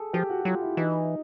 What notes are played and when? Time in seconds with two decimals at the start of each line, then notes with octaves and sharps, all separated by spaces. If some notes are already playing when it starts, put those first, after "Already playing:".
Already playing: G#4 A4
0.13 F3 G4
0.29 F#4
0.40 F#4
0.45 F#3 F4
0.62 E4
0.77 E3 D#4